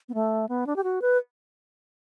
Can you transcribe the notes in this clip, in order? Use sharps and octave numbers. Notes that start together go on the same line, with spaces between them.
B3
A3
B3
D4
G4
F#4
B4